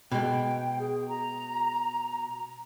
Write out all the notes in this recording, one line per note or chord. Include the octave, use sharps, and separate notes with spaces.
B2 G#3 G5
G#4
A#5